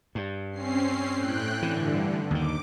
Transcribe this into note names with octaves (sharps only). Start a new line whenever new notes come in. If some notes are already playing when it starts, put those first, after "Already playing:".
G2
C4 C#4 C7
A2 G5 F#6
G2 D3 E3
D#2 D#3 D6